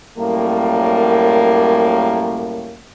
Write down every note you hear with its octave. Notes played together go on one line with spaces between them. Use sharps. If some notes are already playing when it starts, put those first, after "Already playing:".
F#2 A2 G3 A#3